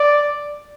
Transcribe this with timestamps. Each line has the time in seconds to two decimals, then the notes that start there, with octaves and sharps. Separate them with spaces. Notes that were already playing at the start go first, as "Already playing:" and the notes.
Already playing: D5